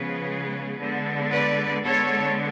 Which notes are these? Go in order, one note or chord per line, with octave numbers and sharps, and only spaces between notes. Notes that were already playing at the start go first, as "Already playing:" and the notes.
Already playing: C#3 F3 G#3 B3 G#4 B4
D3 G#3 B3
B4 D5
D3 G#3 B3 A4 C#5